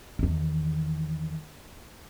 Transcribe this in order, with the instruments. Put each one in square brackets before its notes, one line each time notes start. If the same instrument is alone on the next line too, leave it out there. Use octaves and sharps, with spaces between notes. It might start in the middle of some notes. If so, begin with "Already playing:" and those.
[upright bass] E2 D#3